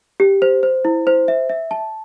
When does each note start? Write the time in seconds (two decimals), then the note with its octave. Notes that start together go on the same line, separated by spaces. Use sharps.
0.20 G4
0.42 C5
0.63 C5
0.85 E4
1.07 C5
1.28 E5
1.49 E5
1.71 A5